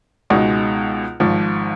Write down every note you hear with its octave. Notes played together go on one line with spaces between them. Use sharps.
C#2 B2 G#3 D#4
G#1 G#2 F3